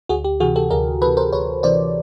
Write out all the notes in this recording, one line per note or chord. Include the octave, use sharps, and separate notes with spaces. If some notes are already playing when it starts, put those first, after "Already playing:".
D2 F#4 G#4
G4
C3 E3 F#4 G#4
G4 A4
D2 G#4 A#4
C3 E3 A4 B4
A#4 C5
D2 B4 C#5
C3 E3 C5 D5